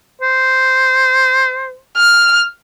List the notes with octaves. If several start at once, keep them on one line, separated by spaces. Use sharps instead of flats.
C5
F6